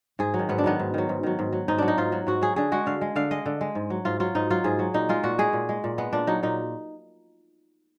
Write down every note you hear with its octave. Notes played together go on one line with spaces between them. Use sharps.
G#2 G#4
F#3
D#3
G#2 B3
D4
D#3 F#3 B3
G#2
D#3 F#3
G#2
D#3 F#3
G#2
F#3
G#2 D#4
F#3 D4
D#4
G#2 F4
F#3
G#2 F#4
F#3 G#4
D3 G#4
G#3 F#4
D3 F5
G#3
D3 F5
G#3 D#5
D3
G#3
G#2
F#3
G#2 F4
F#3 F4
G#2 D#4
F#3 F4
G#2 G#4
F#3
A#2 D#4
G#3 F4
A#2 F#4
G#3 G#4
A#2
G#3
A#2
G#3 B3
A#2 D4
F#3 D#4
A#2 D#4